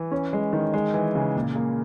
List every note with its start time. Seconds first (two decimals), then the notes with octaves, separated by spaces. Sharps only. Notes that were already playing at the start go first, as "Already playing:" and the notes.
Already playing: E3
0.12 C#4
0.33 G#3
0.53 D#3
0.74 G#3
0.94 E3
1.15 C#3
1.36 A#2
1.56 A#3